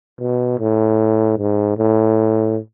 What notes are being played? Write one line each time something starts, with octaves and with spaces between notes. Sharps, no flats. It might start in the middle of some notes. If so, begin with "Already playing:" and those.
B2
A2
G#2
A2